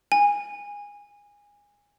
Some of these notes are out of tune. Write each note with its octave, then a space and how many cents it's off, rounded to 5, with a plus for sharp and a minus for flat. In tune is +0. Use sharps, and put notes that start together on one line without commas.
G#5 -20